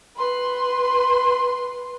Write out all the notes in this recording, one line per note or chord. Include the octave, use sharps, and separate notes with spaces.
B4 C6